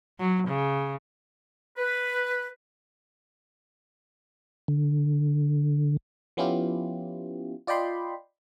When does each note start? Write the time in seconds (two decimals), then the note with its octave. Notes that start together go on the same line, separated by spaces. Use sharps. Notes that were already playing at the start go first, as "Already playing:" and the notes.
0.20 F#3
0.48 C#3
1.77 B4
4.68 D3
6.37 F3 B3 C#4 E4 F4 G4
7.67 F4 D5 D#5 G5 B5 C6